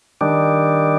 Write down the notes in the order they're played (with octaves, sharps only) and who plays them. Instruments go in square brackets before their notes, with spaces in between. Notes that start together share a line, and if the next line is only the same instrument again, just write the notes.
[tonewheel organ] D#3 G3 D4